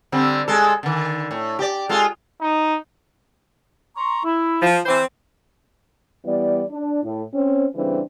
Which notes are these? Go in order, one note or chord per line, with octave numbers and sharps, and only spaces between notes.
D3 G3 C4
G#3 A4
D3 D#3
A2
G4 D5
G#3 F4 A4
D#4
A#5 C6 C#6
E4
F3
E3 C4 C5
E3 G3 B3 D5
D4
A2
C4 C#4
C#3 E3 G3 C4 D4